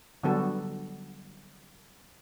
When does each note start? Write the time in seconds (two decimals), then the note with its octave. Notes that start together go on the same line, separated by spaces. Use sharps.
0.23 D3 F#3 G3 B3 F#4 A4